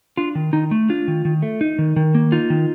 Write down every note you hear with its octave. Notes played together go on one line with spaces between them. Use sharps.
D4 F4
D#3
D#3 D#4
A3
D4 F4
D#3
D#3
A3
D#4
D#3
D#3
A#3
D#4 F4
D#3